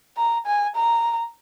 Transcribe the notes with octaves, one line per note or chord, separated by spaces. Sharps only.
A#5
G#5
A#5